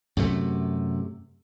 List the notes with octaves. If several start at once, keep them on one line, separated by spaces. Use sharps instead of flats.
F#2 C3 A3